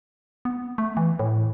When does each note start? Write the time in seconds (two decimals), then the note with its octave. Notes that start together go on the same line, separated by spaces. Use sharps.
0.45 B3
0.78 A3
0.97 E3
1.19 A2